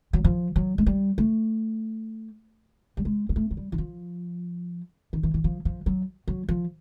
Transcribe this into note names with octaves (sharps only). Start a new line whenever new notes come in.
F#3
F3
F#3
G#3
G3
A3
G3
G#3
G#3
A3
F#3
G3
E3
F3
D#3
E3
E3
F3
F3
F#3
F#3
F3